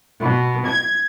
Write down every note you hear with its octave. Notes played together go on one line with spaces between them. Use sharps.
B2
G#6